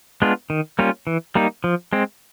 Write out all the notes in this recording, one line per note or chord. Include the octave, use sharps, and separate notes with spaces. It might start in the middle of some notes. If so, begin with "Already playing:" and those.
G#3 B3 D4 F4
D#3
G3 A#3 C#4 F4
E3
G3 A#3 D#4
F3
G#3 C4